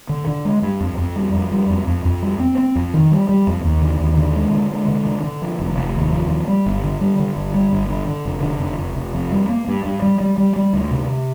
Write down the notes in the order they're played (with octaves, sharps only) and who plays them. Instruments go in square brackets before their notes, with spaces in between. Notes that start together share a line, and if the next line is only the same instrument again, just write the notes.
[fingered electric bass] D3
D3
G#3
G2
F2
F2
G3
F2
G3
F2
F2
F2
G3
C4
C4
F2
D#3
G3
G3
F2
D#2
D3
D#2
D3
G#3
D3
G#3
D3
D3
D3
F3
F1
F1
D#2
F3
F3
G3
G1
D3
G3
D3
G1
G3
G1
D3
D3
F1
D3
F1
F1
F1
F2
G3
A#3
G2
G2
G3
G3
G3
G3
D2
C3